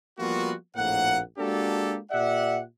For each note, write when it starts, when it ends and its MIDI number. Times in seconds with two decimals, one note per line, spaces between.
0.19 0.54 53
0.19 0.54 55
0.19 0.54 58
0.19 0.54 59
0.19 0.54 65
0.19 0.54 66
0.76 1.20 34
0.76 1.20 41
0.76 1.20 45
0.76 1.20 58
0.76 1.20 78
1.39 1.99 56
1.39 1.99 58
1.39 1.99 62
1.39 1.99 66
1.39 1.99 67
1.39 1.99 69
2.11 2.60 46
2.11 2.60 67
2.11 2.60 74
2.11 2.60 76
2.11 2.60 78